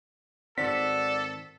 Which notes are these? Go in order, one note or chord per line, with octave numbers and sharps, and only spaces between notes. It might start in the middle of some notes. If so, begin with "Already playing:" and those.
G#2 D#3 C4 F#4 A4 D5 B6